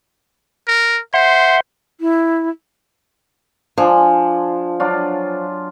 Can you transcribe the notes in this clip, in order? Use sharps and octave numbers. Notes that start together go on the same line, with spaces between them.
A#4
C5 E5 F#5 C6
E4
F3 D4 G#5 C6
F#3 D4 F4